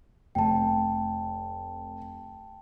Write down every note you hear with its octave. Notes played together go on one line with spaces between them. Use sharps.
F1 G5 A5